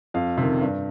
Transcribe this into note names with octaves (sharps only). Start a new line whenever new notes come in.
F2 F5
C3 D#3
G2